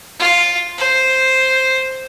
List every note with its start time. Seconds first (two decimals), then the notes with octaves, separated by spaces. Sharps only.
0.19 F4
0.78 C5